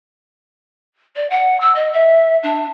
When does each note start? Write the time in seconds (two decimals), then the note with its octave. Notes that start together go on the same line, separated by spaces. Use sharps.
1.16 D5
1.30 F#5
1.60 E6
1.75 D#5
1.92 E5
2.43 D4